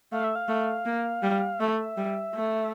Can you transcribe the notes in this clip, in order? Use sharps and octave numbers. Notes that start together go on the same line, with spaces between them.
A3 F5
E5
F5
A3
A#3
G3
A3 E5
G3
A3